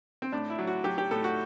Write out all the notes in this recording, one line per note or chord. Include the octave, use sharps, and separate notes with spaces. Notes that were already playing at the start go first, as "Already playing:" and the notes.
C4
A2 D4
E4
F#3
F#4
F#3 G4
G4
A2 A4
F#4